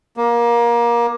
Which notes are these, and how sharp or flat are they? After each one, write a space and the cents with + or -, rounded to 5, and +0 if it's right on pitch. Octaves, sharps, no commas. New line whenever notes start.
A#3 +25